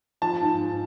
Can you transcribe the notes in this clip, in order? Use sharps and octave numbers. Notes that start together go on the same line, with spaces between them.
F3 A5
G#2
G#2